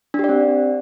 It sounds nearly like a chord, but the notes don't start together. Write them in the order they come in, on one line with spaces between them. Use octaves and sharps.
D4 G4 D5 C4